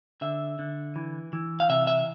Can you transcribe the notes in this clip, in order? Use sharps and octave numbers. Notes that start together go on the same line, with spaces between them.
D3 E5
D3
E3
E3
F5
C3 E5
E5